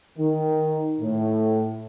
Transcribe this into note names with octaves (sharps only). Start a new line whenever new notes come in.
D#3
A2